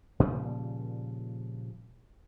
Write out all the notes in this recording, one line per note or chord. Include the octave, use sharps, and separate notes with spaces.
A#2 C#3 F3 G3